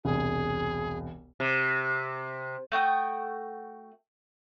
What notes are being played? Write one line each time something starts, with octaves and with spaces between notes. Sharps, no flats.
E1 C2 G#4
C3
A3 F#4 G5 D#6